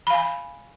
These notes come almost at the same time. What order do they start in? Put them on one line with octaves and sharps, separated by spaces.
B5 F5 G#5